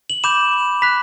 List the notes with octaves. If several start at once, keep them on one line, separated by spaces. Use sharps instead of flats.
F#7
B5 D6 G6 E7
B5 F#6 B6